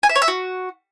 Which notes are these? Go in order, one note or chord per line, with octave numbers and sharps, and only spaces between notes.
G#5
E5
C#5
E5
F#4